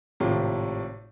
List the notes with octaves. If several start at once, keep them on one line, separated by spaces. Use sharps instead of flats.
G#1 A2 C3 F4